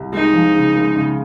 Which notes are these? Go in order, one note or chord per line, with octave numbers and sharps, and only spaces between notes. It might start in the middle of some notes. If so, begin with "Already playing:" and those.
Already playing: C2
G#3 D#4
F3
C#3
G#3
C#3